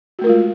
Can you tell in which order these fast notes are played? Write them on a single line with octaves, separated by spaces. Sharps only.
F#4 A3 A#4 F4 G#3